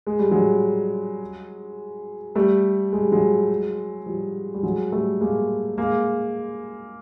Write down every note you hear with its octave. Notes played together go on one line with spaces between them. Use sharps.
G#3
G3
F#3 G#3
G3 A3
G#3
G3
F#3 G#3
F3 G3
G3
F#3 G#3
G3 A3
G#3 A#3
G#3 A#3